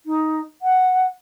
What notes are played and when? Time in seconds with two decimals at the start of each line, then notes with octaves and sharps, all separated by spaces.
0.06 D#4
0.62 F#5